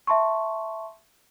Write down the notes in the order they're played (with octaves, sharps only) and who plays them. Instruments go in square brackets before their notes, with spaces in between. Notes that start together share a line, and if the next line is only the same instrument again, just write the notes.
[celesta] E5 A5 C6 C#6